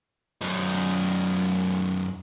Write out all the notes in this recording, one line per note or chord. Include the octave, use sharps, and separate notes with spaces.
F#2 D#4